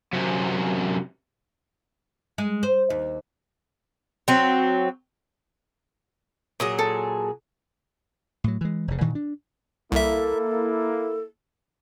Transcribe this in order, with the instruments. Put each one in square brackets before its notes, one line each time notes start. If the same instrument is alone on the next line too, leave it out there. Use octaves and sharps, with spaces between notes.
[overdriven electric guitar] F#2 C3
[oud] G#3
C5
D#2
[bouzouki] F#3 C4
[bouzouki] A#2 F#3 G#4 [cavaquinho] D#6
[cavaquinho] A4
[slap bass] A2 F#3
E3 G#3
F1 C#3
G2 A#2 D#3 E3
D4
[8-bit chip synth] C2 E5 [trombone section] A#3 E4 [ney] A4